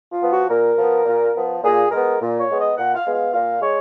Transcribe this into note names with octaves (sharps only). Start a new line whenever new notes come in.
F4
F3 B3
F#4
A#2 A#4
F3 B3
A#2
F3 B3
A#2 G#4
G#3 B3 A#4
A#2
C#5
G#3 B3
D#5
A#2 F#5
F5
G#3 B3
F5
A#2 F5
G#3 C#5